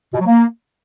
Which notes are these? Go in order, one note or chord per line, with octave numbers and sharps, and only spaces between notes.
B2
F#3
A#3